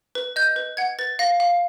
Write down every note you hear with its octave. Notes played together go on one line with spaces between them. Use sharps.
B4
D#5 G6
B4
F#5 G#6
B4 A6
F5 A#6
F5